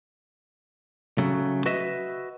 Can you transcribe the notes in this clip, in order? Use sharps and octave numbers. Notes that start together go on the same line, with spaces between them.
C#3 F#3 A3
F#4 B4 D#5 E5